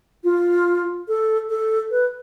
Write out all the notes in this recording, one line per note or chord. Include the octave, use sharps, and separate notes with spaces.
F4
A4
A4
B4